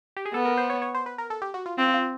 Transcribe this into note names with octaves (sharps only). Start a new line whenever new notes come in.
G4
G#4
B3 A4
A#4
C5
C#5
C#5
C5
B4
A#4
A4
G4
F#4
F4
C4 F4
F4